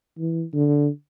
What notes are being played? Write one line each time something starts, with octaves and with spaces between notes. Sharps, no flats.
E3
D3